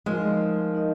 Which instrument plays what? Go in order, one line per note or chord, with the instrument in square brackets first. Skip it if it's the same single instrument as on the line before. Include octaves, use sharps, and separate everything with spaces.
[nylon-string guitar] F3 G#3 [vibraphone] D#4 A#4 D#5
[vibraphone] D#4 A#4 D#5